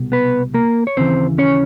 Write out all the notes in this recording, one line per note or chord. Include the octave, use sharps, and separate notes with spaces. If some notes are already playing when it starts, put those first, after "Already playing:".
Already playing: C2 B2
B3 B4
A#3 A#4
C#5
D#2 C#3 E3 C4 C5
C#4 C#5